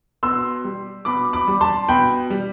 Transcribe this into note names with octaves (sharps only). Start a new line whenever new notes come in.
B2 C6 E6
G3
B2 B5 D6
B5 D6
G3
A5 C6
B2 G5 B5
G3